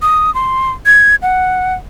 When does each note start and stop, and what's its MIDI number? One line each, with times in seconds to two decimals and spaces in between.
0.02 0.33 87
0.35 0.71 84
0.86 1.15 92
1.22 1.74 78